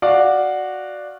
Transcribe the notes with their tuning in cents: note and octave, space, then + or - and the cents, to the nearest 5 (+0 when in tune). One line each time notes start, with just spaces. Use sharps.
F#4 -5 D5 +5 F5 +0